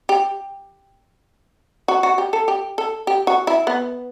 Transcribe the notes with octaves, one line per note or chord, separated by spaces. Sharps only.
G4
F#4
F#4
G4
A4
G4
A4
G4
F#4
E4
B3